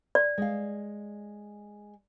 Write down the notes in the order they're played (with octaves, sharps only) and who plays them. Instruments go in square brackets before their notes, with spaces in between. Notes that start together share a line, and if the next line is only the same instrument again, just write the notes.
[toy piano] D5
[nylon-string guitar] G#3 F5